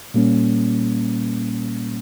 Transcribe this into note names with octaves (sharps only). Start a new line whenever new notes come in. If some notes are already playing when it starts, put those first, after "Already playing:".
A#2 G3 A#3 C#4